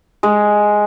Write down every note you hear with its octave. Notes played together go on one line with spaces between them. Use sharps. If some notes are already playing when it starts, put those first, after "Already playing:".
G#3